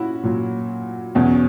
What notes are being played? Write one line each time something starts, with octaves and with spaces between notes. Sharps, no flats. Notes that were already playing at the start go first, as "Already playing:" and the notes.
Already playing: A#2 C#4 E4 F#4
A#2 F#3
E2 B2 F#3 C#4